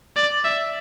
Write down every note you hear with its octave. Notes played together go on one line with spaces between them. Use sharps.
D5
E5